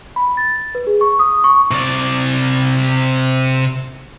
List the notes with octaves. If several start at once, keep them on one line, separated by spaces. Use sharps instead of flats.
B5
A6
B4
G#4
C#6
D#6
C#6
C3 D5